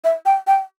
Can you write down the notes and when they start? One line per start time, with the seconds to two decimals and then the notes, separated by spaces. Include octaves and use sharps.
0.04 E5
0.26 G5
0.47 G5